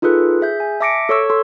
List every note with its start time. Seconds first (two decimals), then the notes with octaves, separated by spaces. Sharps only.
0.02 D#4 F4 G#4 A4 B4
0.41 G#4 E5 G6
0.60 G#5
0.81 E5 A5 D6 A#6 C#7 D7
1.09 A4 C#5 C#6 E6
1.30 A4 C6